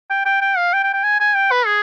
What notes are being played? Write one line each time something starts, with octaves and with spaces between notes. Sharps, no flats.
G5
G5
G5
F5
G5
G5
G5
G#5
G#5
G5
B4
G#4